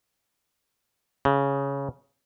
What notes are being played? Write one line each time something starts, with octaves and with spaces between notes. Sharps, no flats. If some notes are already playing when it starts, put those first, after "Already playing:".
C#3